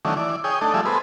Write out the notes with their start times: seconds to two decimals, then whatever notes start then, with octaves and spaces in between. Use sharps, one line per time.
0.05 D#3 E3 F#3 A3 C#4 D4
0.17 E3 D5
0.44 G#4 C#5 G5 D#6
0.61 A3 D4 D#4 A4
0.74 F3 G3 A3 G#4 D5 E5
0.85 B3 G#4 A4 B4 C5